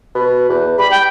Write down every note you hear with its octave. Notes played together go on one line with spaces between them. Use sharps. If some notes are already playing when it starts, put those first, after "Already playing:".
B2
E2
G3 B5
G5